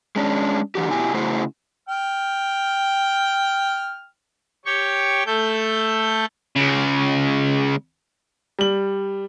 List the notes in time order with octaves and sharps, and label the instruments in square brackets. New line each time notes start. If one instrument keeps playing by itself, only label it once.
[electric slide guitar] G#3 C#4 D4
D3 E3 F#4 G4
B2 E4 G4 G#5
C#3 A3 E4 F#4 G#4 C5
[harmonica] G5 F6
[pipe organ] G4 C#5 G5 C#6
A3 A4 G6
[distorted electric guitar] C#2 C#3
[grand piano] G3 F#7